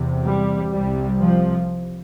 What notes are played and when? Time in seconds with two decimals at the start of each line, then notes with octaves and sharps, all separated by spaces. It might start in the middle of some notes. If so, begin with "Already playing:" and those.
Already playing: E2 C3
0.25 G3
0.72 C2 C3 G3
1.21 F3